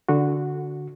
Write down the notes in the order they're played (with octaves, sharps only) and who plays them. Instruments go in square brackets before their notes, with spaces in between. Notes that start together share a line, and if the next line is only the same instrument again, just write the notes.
[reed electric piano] D3 F#4